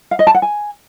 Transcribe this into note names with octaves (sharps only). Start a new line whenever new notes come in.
F5
D#5
A5
F#5
G#5